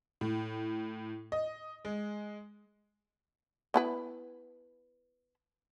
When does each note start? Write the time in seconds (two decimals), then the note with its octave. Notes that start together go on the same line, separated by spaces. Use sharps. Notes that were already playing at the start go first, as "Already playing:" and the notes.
0.21 A2
1.32 D#5
1.85 G#3
3.74 B3 E4 B4